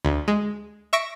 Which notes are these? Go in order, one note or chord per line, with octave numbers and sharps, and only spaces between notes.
D2
G#3
E5 C#6 A#6 D7